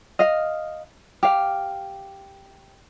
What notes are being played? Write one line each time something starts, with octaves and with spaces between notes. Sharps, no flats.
D#5 F5
G4 F5